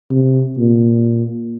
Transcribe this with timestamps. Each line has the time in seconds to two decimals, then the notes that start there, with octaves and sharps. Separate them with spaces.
0.11 C3
0.58 A#2